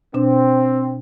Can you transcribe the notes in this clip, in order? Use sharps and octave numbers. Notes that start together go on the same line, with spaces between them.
B2 C4 D4